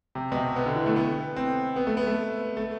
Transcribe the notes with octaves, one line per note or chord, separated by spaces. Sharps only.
C3
B2
C3
B3
D3
E3
A3
B3
C4
B3
A3
B3
A3
A3